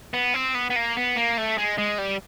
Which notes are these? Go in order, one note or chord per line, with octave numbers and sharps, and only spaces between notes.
B3
C4
B3
B3
A#3
B3
A#3
A3
G#3
G#3
G3